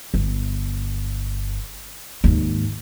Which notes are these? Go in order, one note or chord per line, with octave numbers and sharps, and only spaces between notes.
G1
D#2 G#2